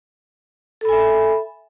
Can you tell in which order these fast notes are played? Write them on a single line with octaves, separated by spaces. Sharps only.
A4 B5 G#5 E5